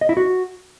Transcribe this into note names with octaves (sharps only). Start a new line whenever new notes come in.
D#5
E4
F#4